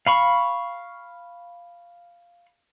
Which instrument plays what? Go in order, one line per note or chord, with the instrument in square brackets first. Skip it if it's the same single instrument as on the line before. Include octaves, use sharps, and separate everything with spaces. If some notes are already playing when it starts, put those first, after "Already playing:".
[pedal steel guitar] F5 B5 C#6